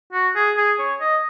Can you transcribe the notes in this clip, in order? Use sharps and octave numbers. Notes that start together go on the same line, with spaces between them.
F#4
G#4
G#4
C#5
D#5